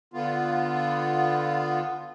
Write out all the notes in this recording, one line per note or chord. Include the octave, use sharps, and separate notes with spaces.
D3 B3 F4